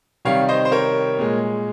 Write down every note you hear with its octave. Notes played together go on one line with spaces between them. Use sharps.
C3 D#3 G3 C#5 F5
C5 D#5
C5
A#4 C#5
A#2 G#3